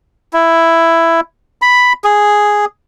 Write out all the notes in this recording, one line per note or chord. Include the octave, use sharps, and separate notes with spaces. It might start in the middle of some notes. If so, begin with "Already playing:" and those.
E4
B5
G#4